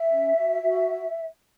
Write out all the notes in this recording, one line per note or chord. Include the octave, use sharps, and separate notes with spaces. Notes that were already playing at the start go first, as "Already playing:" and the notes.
Already playing: E5
C#4
F#4
F#4